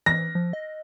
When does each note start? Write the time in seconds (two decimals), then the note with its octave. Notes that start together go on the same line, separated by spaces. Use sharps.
0.06 E3 A#6
0.35 F3
0.53 D#5